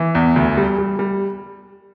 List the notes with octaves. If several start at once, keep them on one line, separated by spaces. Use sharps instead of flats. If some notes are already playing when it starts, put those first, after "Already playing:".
Already playing: E3
E2
D2
G3
G3
G3